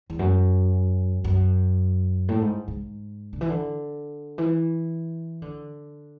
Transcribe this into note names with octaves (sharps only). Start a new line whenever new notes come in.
E2
F#2
F#2
A2
G#2
G#2
D3
E3
D3
E3
D3